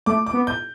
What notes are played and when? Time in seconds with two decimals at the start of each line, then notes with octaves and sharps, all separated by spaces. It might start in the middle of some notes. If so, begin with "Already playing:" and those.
0.06 A3 D6
0.26 D6
0.33 B3
0.47 G6